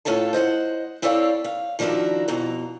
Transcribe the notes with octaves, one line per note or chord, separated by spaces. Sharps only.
A2 C#4 F4 A4 A5
C5 D#5 F5 F#5
C4 E4 A4 C#5 D5 F5
F5
D#3 F3 D4 E4 F#4 A#4
F2 B2 A#5